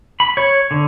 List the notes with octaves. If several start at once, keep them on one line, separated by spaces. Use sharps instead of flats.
B5
C#5
D3